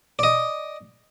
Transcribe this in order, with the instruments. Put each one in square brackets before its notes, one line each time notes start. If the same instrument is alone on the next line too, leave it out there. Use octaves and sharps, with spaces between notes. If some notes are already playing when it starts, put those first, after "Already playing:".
[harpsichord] D5 D#5